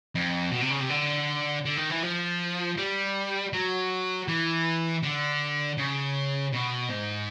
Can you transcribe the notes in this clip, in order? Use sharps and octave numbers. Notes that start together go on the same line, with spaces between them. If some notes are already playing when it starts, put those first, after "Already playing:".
F2
B2
C3
C#3
C3
D3
D3
D#3
E3
F3
G3
F#3
E3
D3
C#3
B2
G#2